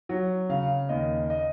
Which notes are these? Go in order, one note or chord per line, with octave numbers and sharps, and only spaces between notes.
F#3
C#3 F5
D#2 D#5
D#5